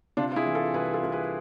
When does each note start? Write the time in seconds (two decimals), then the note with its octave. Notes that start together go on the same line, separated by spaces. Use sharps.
0.17 C3 D4 F4
0.32 F4
0.36 E4 G#4
0.46 E3
0.55 F4 A4
0.74 C2 G#4 B4
0.94 F4 A4
1.03 C2
1.12 G#4 B4